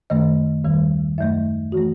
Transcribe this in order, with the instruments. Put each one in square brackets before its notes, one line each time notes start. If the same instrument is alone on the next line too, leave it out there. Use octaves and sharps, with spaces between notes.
[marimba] F#2 D#3 A3 D#5
D#2 D#3 G3
F#2 F#3 A3 E5
E3 A3 F#4